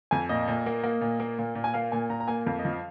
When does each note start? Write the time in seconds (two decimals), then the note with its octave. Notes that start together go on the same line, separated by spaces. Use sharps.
0.11 F2 G#5
0.29 A#2 D#5
0.48 A#2
0.66 A#3
0.84 A#3
1.01 A#2
1.20 A#3
1.39 A#2
1.55 A#2
1.64 G#5
1.74 A#3 F5
1.92 A#2 G#5
2.10 A#2 A#5
2.20 A#5
2.28 A#3 G#5
2.46 F2 F5
2.59 D#5
2.65 F3
2.73 F5